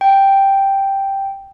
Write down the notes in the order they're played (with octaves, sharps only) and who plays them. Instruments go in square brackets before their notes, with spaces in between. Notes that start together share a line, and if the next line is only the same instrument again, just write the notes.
[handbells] G5